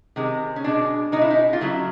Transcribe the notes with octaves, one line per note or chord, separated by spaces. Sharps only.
C3 D#3 G#3
C#4
B2 G#3 D4
B2 G#3 D#4
E4
D#4
F4
C#3 F#3 A3 E4